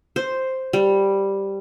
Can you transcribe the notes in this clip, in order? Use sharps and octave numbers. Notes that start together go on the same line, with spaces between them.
C5
G3